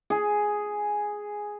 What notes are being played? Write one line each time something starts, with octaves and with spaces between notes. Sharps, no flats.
G#4